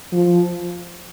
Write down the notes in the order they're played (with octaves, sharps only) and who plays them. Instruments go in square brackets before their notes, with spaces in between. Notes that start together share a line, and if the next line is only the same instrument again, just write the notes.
[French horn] F3